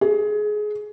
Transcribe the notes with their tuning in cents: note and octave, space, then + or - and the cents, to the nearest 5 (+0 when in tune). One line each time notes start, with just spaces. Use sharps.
G#4 +20